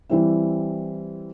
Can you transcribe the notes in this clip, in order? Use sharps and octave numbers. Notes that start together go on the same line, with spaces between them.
E3 G3 C4 E4